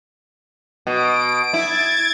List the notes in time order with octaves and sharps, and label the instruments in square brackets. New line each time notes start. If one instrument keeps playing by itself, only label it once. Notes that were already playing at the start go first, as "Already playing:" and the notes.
[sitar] B2 [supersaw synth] D7
[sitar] E4 [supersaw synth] G#6 A6